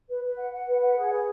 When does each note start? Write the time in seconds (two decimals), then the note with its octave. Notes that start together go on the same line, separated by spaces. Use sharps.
0.09 B4
0.24 B4
0.38 F#5
0.53 F#5
0.67 B4
0.83 F#5
0.98 G#4
1.12 B4